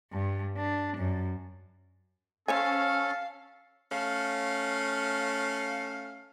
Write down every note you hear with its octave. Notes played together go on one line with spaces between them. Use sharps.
G2
D4
F#2
C#4 A4 C5 C#5 F5 G#5
A3 C#4 F5